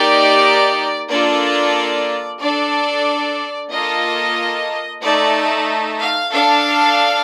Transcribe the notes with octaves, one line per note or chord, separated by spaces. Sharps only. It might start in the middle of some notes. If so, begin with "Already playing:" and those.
Already playing: A#3 D#4 G4 D5
A#3 D4 F4 A4 D5
D4 A4 D5
A#3 F4 A4 D#5
A3 D#4 A4 D5
F5
D4 A4 F5